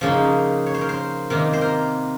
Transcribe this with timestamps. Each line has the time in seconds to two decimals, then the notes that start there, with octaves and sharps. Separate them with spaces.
0.01 C#3 F3 A#3 D#4
0.66 C#5
0.75 C5
0.81 A#4
0.89 C5
1.30 C3 D#3 A#3 A#4
1.53 C5
1.61 A#4